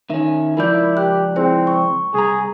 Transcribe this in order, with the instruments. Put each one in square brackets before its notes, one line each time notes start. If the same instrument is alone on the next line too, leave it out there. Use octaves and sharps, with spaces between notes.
[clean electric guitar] D#3 C#4 [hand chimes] E5
[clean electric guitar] C#2 F3 D5 [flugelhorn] E4 [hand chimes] A#4 G6
[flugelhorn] G4 [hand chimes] F#6
[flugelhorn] C4 [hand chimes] E4 G#4 C5
[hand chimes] C#6
[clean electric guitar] C2 A#5 [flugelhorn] G#4